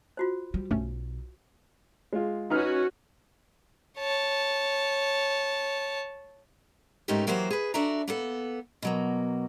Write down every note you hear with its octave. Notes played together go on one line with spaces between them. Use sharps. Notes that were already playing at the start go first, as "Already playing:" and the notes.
F4 F#4 C5
G3
B1 G2 A3 C#4
G#3 F4
C#4 D#4 F#4 B4 F6
C#5 A5
G#2 A3 C#4 D#4 G4 A#4
E3 F#3 A#3 F#4 G4 C5
G#4 B4
D4 F#4 A4 D5 E5 A#5
A#3 B3 A4
B2 F#3 A#3